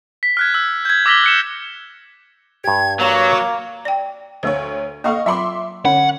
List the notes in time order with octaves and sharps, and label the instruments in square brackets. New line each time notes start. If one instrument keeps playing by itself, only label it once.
[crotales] B6
F6 F#6 G#6
E6
G6 G#6
D6 E6 A#6 B6 F#7 G7
F#6 C#7 E7
[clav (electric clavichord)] G2 G4 [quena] G#6
[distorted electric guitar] F#3 [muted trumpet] A#3 [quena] C#5
[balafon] D5 G5
[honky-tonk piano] D2 C#5 [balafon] A3 C5
[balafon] A#3 A4 [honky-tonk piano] D#5 F5 C#6
[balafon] F#3 F4 B5 [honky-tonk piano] E5 C6 D6
[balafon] D3 [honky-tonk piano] C#4 [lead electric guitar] F#5